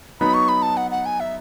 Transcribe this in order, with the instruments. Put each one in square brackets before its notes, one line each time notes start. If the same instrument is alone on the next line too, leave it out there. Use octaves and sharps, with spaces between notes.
[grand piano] F#3 B3 D#4 [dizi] B5
[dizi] C#6
B5
A5
F#5
F#5
G#5
E5